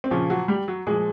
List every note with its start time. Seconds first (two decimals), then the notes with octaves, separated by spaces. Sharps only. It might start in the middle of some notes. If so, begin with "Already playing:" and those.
0.04 C4
0.11 A#2 C#3 F3 C#4
0.30 F#3 F#4
0.48 G3 G4
0.68 F#3 F#4
0.87 A#2 F3 G#3 G#4